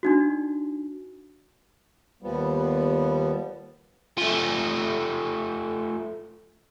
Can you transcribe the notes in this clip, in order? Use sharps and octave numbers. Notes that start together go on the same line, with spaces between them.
D4 D#4 F#4
D#2 F3 G3 B3
F3 A3